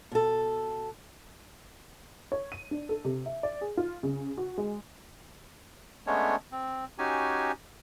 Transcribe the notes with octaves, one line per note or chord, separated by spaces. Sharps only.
B2 A4
C#5
D#7
D4
A4
C3
E5
D5
G#4
F4
C#3
F#4
G#3
G#3 A3 B3 C#4 D4 C#5
C4
C#4 D#4 F#4 G4 G#5